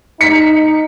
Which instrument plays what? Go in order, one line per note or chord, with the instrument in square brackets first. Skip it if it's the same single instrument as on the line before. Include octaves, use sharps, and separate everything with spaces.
[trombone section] D#4 [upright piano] B6 C#7